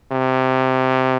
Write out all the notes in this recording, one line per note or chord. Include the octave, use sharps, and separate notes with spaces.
C3